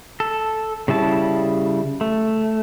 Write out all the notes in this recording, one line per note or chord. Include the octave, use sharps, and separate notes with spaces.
A4
C#3 G3 E4 A5
A3